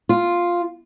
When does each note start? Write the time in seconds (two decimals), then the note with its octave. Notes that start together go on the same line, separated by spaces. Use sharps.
0.09 F4